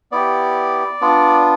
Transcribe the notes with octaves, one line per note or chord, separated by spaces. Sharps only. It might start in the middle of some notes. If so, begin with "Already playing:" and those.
B3 E4 G4 D5
B3 D4 F4